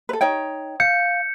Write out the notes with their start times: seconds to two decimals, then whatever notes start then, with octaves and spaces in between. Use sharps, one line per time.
0.09 A4 B4
0.21 D#4 C#5 G5
0.80 F5 G6 C#7